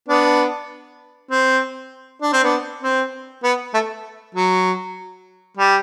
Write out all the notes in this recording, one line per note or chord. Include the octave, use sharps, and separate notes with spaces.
B3 D4
C4
D4
C4
B3 D4
C4
B3
A3
F#3
G3